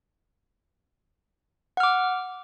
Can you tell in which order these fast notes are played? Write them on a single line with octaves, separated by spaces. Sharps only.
F#5 F6 D6